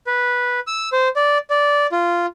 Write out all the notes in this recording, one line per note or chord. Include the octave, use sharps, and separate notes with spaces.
B4
E6
C5
D5
D5
F4